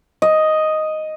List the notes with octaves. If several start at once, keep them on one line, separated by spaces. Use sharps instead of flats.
D#5